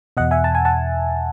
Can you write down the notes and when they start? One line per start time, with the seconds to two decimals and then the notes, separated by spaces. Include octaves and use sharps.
0.17 E2 B2 D#5 F#5
0.31 E5 G#5
0.44 A5
0.55 G#5
0.65 F#5 A5